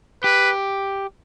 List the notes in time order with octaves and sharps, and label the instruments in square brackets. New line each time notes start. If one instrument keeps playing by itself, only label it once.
[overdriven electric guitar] G4 [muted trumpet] B4